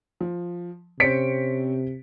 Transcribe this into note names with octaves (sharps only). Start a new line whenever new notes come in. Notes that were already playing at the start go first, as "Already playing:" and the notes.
F3
C3 C4 C#4 C5 B6 C#7 D7